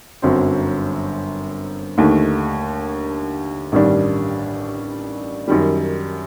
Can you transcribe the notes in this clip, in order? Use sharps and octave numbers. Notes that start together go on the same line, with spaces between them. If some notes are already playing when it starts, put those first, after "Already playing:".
G1 F#2 F#3 C4
D#2 D3 A3 D#4
A1 G2 D#3 G3 D4
F#2 D#3 G3